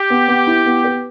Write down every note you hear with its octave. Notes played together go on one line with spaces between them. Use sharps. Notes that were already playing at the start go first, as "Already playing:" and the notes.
Already playing: G4
B3
B3
E4
B3
B4